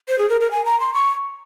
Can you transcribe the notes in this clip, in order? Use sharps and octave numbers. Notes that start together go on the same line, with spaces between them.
C5
G#4
A#4
A#4
G#5
A#5
C6
C#6